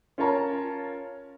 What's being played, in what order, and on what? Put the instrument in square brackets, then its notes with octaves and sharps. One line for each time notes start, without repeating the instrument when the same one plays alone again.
[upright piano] C#4 F4 A#4 C#5 A5 A#5